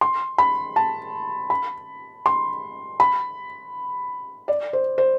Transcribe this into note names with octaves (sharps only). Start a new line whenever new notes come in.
C6
B5
A5
B5
C6
B5
D5
C5
C5